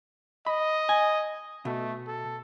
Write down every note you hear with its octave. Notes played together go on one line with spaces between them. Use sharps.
D#5 B5
G#5
B2 A3
A4